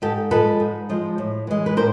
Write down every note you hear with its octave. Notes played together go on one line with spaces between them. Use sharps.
G#2 G4 A4
F3 G#3 A4 B4
G#2
F3 G#3
A2
E3 G#3
B4
A2 A#4 C5